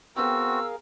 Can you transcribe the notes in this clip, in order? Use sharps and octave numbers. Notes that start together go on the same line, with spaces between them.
B3 C4 F#4 G#4 A#4 F5 G5 E6